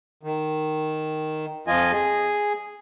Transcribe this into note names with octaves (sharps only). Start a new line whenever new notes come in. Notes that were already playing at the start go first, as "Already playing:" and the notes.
D#3
F2 F3 F4 D#5 G#5
G#4